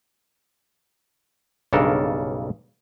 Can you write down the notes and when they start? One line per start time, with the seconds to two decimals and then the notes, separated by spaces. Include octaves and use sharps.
1.73 B1 G2 C#3 D4 A4 A#4